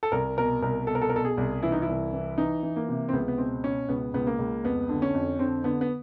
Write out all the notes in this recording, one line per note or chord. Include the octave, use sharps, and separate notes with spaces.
A4
C2 A#4
B2 A#4
C2 A#4
B2 A4
A#4
A4
A#4
B2 A4
G#4
C2
E3 E4
D#4
E4
C2
E3
E3 D#4
E3
A#3
C3
C4
C#2 B3
B3
B2 C4
B2 C#4
C#2 B3
C#2 B3
A#3
C#2
F2 B3
D3
C#4
F2
D3 C4
D3 B3
B3